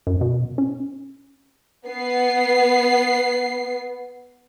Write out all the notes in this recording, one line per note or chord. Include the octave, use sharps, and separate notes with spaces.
F#2
B2
C#4
B3 C7